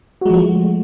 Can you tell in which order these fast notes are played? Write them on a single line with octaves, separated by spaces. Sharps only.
F#4 G#3 F3 A3